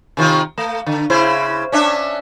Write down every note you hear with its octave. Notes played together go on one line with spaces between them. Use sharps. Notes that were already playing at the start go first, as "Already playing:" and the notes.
C3 D#3 F4
A3
D3
C#3 E4 C5
C#4 D4 E5